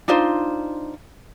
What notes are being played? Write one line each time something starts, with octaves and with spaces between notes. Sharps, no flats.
D4 D#4 F4 C5